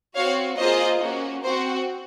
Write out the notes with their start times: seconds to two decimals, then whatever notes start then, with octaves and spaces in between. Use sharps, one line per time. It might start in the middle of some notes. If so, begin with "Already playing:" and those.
0.16 C4 F#4 C#5 F5
0.58 A#3 F4 G#4 C5 D#5
1.01 A#3 C#4 F#4
1.43 C4 F#4 C5